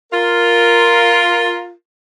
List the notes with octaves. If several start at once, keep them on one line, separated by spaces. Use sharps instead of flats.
F4 A#4